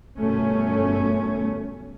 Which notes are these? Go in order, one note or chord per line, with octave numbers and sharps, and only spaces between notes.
G1 F#2 B2 A3 C#4